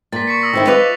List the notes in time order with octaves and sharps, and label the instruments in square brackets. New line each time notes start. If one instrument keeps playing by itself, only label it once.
[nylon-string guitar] A#2 [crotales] A6 B6
[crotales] C#6 B6 C#7
D#6 E6 A#6
[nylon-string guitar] D#3 C4 E4
[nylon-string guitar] F4 B4 D#5 [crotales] D6 F#6 F7